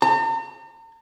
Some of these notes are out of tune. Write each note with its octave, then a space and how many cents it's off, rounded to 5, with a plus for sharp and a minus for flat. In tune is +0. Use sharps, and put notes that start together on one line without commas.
A#5 -45